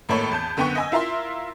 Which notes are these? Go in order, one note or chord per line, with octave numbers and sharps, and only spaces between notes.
G#1 A2 A#3 A4 C#5 B5
E2 A5 G6
F#1 D3 B3 F#5 G5 C#6
D#5 G#5 E6
E4 F4 A#4 E5 C6